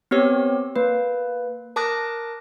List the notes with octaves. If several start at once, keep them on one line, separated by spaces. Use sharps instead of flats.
B3 C4 G4 C#5 E6
A#3 B4
A#4 A5 D6 D#6 F#6 A#6